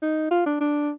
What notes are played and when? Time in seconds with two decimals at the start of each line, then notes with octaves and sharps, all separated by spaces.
0.02 D#4
0.31 F4
0.46 D4
0.60 D4